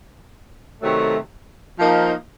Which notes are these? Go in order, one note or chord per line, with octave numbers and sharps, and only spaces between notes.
C3 D#3 F#3 A3
F3 A#3 D#4